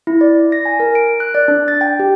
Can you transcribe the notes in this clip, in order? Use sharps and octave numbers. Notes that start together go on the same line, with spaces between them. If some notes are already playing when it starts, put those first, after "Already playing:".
E4
D5
A#6
G#5
A#4
D7
F#6
D5
D4
A6
G5
G4